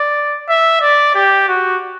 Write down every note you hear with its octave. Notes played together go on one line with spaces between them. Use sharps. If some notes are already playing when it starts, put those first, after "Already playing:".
Already playing: D5
E5
D5
G4
F#4